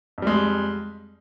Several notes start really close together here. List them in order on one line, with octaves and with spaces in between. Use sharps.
F2 G3 G#3